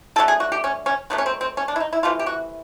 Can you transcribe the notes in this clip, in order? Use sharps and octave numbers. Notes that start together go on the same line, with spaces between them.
D3 F#3 A3 A4
G#4
F#4
G4
C#4
C#4
D#3 F#3 A3 B3
C#4
C4
C4
C#4
D4
E4
D#4
E4
C3 E3 A3 F4
G4
F#4